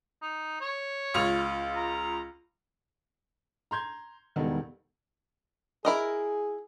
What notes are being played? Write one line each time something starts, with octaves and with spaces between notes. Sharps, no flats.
D#4
C#5
C#2 F4 F7
A#5
A#5 C6 G6 G#6
E1 D#3 G3 B3 D#4 A4
E4 G#4 A#4 D#5